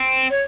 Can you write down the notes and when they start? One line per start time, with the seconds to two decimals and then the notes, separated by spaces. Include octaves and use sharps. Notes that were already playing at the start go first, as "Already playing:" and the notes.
Already playing: C4
0.30 C#5